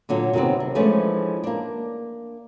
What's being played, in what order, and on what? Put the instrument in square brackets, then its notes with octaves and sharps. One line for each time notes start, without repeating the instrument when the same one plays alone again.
[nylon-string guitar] A#2 D3 F#3
C3 D#3 F#3 B3 C4
D4
E3 F3 G#3 A3 C#4 D4
A#3 D4